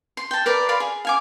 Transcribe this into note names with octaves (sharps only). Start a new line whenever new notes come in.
C6
G5 A5
A#4 B4 D5
D5 F5 B5 C6
G#4
F5 G#5 D6